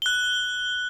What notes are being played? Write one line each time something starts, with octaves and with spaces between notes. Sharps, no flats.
F#6 G7